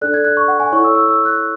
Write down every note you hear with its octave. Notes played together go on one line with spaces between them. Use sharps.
D4 A4 D5 F#6
G#6
F#6
C#6
F#5
G#5
E4 A4 C#5 C#6
E6
E6
E6
F#6